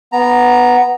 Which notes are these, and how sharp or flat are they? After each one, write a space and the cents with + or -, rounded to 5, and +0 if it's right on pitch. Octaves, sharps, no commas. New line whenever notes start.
B3 +0 A#5 +0